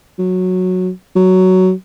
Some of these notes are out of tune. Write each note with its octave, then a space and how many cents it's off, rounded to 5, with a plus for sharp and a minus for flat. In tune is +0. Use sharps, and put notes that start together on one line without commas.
F#3 -10
F#3 +10